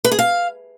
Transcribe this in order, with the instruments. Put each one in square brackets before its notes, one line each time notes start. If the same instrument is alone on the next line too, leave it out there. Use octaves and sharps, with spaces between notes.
[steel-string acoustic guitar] B4
G#4
F5